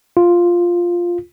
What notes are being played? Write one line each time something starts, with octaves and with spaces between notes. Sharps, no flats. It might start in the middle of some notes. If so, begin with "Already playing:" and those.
F4